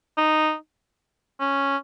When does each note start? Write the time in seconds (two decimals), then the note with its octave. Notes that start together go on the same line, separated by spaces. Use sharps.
0.18 D#4
1.40 C#4